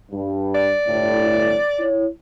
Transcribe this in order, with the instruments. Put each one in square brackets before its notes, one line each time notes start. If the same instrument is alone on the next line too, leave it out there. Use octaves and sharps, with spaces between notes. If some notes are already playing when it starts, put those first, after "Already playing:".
[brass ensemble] G2
[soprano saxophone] D5
[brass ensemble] G1 A2
E4 C#5